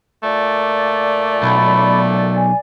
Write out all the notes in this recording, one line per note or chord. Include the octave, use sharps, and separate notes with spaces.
A#2 A3 D5
B1 B5
G#5